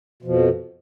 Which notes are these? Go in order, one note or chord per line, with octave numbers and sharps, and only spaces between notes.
F2 B2 F3